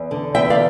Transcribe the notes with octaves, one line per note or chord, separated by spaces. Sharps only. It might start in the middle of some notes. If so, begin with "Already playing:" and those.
Already playing: E2
D3
E2 E5 G5
D5 F5